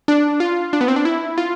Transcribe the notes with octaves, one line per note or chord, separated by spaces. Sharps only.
D4
F4
D4
B3
C4
D4
E4
F4